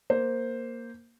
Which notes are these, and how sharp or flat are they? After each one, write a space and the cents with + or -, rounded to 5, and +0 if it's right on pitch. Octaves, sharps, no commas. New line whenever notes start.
A#3 +0 C5 +0